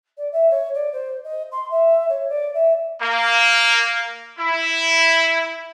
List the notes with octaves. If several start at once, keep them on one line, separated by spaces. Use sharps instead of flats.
D5
E5
C#5
D5
C5
D#5
C6
E5
C#5
D5
E5
A#3
E4